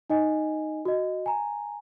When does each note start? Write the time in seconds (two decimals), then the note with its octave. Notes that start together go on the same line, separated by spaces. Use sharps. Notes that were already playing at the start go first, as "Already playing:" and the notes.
0.10 D#4 D#5 G#5
0.85 F#4 D#5
1.26 G#5 A#5